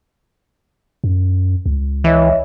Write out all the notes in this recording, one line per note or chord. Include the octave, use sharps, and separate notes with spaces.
F#2
C#2
E3 C#5 D#5 E5